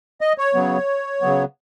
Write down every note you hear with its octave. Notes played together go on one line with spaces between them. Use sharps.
D#5
C#5
C#3 F#3 B3
C#3 F#3 B3